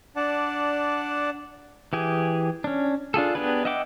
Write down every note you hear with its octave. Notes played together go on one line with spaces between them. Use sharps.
D4 D5 F#5 A5
E3 G4 G#4
C#4 D4
D4 F4 G#4 A4
B3 D4 G4 G#4 B4
D#5 E5 F#5 G5 D6